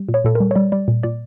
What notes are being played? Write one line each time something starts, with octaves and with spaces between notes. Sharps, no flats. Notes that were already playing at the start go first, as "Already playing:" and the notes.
Already playing: G3
A#2
C#5
A#2 A4
A#4
G3
C#5
G3 D5
G3 D5
A#2
A#2 D5